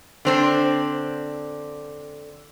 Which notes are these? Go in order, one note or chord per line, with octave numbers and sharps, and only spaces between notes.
D3 C4 D4